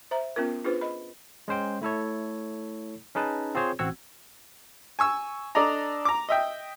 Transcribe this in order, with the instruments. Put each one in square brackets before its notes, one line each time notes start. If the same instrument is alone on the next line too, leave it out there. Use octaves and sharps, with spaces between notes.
[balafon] C5 E5 A#5
B3 C#4 F4 A#4
D4 F4 G#4 B4 C5
D#5 B5
[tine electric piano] G#3 C#4 C5 G5
A3 E4 A4 C#5
C#4 D#4 G#4 B4 A5
C4 F4 G#4 C5 C#5
A1 C4 F#4 F#5 E6 G#6
[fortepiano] G#5 C#6 E6
D4 A4 D5 D#5 A#5
A#5 D6
D#5 E5 G5